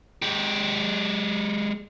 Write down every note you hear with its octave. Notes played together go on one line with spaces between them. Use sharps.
G#3 G4